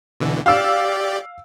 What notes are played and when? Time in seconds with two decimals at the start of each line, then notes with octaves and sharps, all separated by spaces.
0.20 B2 D3 E3
0.46 G4 D5 F5 E6